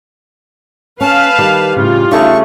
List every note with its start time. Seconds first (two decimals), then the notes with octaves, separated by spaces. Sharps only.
1.01 C#4 B4 F5 A5
1.38 D#3 G3
1.76 A2 C#3 F4
2.11 C#3 A3 D#4 G#4 C#6